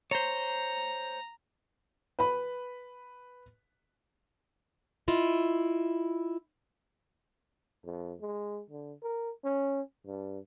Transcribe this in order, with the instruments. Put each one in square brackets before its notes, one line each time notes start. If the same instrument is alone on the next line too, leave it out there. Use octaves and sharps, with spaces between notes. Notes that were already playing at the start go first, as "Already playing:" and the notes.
[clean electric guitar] C5 C#5 [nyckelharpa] A#5
[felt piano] B4 B5
[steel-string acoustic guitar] E4 F4 D#5
[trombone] F2
G#3
D3
A#4
C#4
G2